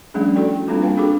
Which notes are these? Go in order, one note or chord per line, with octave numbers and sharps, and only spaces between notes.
F3 G3 A3 C#4 D4 G#4
E4 F#4 A4 D5 G5
G3 A#3 C4 D4 F4 A4
B4 F5 G5 A5
D4 F#4 G#4 A4 D6